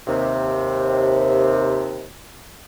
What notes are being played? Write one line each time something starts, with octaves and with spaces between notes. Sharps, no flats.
D#2 C3